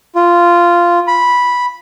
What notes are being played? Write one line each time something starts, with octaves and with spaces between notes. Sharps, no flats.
F4
B5